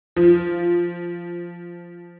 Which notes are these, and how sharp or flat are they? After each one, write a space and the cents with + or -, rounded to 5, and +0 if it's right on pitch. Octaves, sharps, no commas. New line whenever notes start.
F3 -5